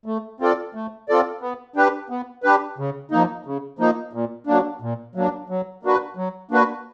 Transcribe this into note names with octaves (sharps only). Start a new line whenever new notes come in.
A3
C4 F4 A4 D5
A3
C4 F4 A4 D5
B3
D4 G4 B4
B3
D4 G4 B4
C#3
F3 A#3 D#4
C#3
F3 A#3 D#4
A#2
F#3 A#3 D4
A#2
F#3 A#3 D4
F#3
A#3 D4 F#4 B4
F#3
A#3 D4 F#4 B4